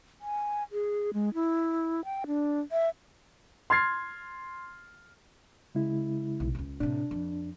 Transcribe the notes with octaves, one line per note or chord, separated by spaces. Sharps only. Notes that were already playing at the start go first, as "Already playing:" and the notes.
G#5
G#4
G#3
E4
G5
D4
E5
C6 F6 G#6 A6 C7
C#3 G#3 E4
B1
C#2 F4
A2 C3 D4
F2